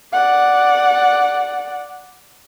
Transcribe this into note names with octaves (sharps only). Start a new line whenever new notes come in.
D5 F#5